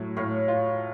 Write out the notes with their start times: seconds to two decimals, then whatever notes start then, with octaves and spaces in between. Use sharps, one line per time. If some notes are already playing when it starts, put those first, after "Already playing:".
Already playing: A2 F#3
0.16 A2 C#5 F5
0.48 F4